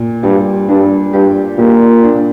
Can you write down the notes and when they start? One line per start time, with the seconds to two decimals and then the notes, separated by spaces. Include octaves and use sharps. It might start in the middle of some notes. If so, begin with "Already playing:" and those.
Already playing: A#2
0.23 G2 G3
0.68 G2 D4
1.13 G2 G4
1.58 A#2 G4
2.03 D4